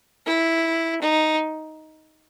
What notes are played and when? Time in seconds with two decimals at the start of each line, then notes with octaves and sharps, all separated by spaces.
0.26 E4
1.01 D#4